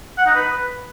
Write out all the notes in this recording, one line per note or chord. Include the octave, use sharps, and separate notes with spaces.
F#5
D#4
B4